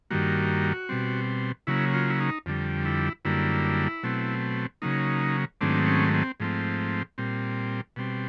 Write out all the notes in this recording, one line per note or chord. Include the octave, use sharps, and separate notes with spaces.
G2 D#3 G3 A#3 F#4
B2 G3 C4
C#3 F#3 A#3 E4
F4
E4
D#4
F2 D3 G3
E4
F#2 D3 G3 A#3 E4
B2 F#3 A3 C4
C#3 F#3 A#3 D#4
G#2 D#3 F#3 A3 C4 D4
C#4
C4
G#2 F3 A3 C4
A#2 G3 C4
B2 G3 C4